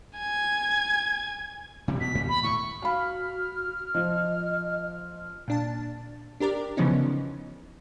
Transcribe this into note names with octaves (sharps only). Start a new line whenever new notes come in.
G#5 G#6
C3 E3 G3
B2 B6
G2 A#2 G3
D#2 B5
A2 C#6
F#4 F5 B5 F6
F3 D#5
A#2 D4 A5
D4 G4 A#4 D5
C#3 E3 F3 B3 C#4 D#4